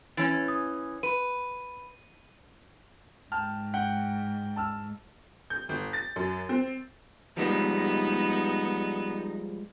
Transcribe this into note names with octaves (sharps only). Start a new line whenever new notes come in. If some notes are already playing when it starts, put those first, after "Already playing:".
E3 C#4 A6
D#6
B4 D#7
G#2 G5 A5 F6
F#5 G5
A5 E6 F6
G6
G1
A6
F#2
C4
F3 G3 G#3 B3 D#4 D#5